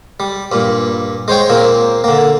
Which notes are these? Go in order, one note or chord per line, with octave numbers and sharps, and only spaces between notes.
G3
G2 A#2
G#3 C5 C#5 G5
A#2 A#3 C4
D3 A#3